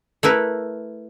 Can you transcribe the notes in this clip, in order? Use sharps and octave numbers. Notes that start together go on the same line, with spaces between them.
A3 E4 A#4 B4